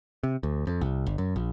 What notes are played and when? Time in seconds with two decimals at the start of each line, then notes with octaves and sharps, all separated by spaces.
0.23 C3
0.43 D2
0.67 F2
0.81 C2
1.06 G1
1.18 F#2
1.36 A#1